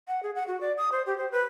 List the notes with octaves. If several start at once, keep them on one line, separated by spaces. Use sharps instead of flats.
F#5
G#4
F#5
F#4
D5
D#6
C5
G4
C5
B4